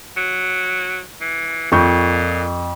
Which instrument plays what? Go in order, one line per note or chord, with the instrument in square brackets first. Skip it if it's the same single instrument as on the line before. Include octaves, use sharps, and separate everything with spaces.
[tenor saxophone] F#3
E3
[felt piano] F2 C#6 G6 [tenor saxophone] A#2